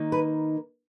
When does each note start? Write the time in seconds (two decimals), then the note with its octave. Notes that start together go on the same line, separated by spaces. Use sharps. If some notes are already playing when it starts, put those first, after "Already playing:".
Already playing: D#3 A#3 D#4
0.12 B4